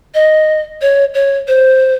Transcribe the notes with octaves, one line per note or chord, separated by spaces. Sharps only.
D#5
C#5
C#5
C5